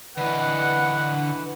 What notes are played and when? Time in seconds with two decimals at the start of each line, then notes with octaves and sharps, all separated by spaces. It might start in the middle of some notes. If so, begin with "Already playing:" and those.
0.17 D3 E3 B4 D#5 F#5